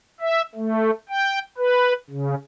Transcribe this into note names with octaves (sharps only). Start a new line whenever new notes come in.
E5
A3
G5
B4
C#3